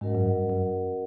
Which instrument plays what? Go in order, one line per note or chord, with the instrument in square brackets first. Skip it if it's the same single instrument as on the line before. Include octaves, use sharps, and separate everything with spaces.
[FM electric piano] G#2 [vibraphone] C#4 F#4 A#4 D#5 F#5
[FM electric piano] F#2
G2
F#2